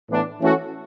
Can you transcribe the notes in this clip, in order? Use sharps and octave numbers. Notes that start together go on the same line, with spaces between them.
A2 E3 B3 D4
E3 A3 C#4 F#4 A4